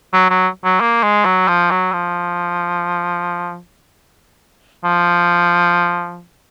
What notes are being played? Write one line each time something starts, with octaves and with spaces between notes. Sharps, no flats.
F#3
F#3
F#3
A#3
G#3
F#3
F3
F#3
F3
F3